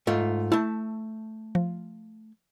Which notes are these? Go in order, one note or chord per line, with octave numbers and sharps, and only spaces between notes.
G#2 A3 F4
A3 E4 A5
F3